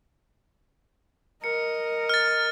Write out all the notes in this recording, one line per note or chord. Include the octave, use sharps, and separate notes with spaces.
A#4 D#5 C#7
F6 A6